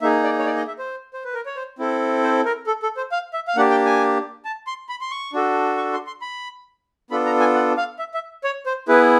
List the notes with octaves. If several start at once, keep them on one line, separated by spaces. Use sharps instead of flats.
A#3 D#4 G#4 E5
D5
C#5
D5
D#5
E5
C5
C5
B4
A#4
C#5
C5
C4 E4 A4
C5
A#4
A4
A4
C5
F5
E5
F5
A#3 D4 G4 F#5
G5
G#5
A5
C6
B5
C6
C#6
D4 F#4 A4
C#6
C6
C6
B5
B3 D4 F4 A4 B5
A#5
G#5
F#5
F5
E5
E5
C#5
C5
B3 E4 G#4 B4